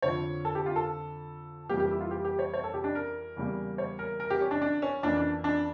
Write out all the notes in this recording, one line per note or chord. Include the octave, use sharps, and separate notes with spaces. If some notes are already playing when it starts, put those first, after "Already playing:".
F2 D3 F3 C#5
A4
G4
F4
A4
F2 E3 G3 A#3 G4
G4
E4
F4
G4
G4
C#5
C#5
A4
G4
D4
A#4
E2 C#3 G3 A#3
C#5
A#4
A#4
G4
C#4
D4
D4
C#4
F2 E3 A#3 D4
D4
D4